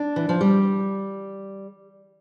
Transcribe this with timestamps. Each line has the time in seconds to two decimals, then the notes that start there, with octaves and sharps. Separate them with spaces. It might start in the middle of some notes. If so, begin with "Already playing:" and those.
Already playing: D4
0.16 E3
0.29 F3
0.41 G3